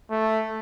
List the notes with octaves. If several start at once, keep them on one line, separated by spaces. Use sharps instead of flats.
A3